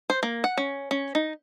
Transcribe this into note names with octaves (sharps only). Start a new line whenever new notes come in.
C5
A#3
F#5
C#4
C#4
D#4